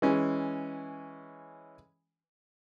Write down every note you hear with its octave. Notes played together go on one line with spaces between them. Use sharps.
E3 G#3 C#4